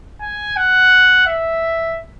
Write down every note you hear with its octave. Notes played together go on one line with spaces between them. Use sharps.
G#5
F#5
E5